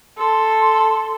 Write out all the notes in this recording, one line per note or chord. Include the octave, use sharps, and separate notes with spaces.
A4 C6